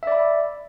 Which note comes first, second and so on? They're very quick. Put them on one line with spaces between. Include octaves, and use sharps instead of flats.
E5 D5 B5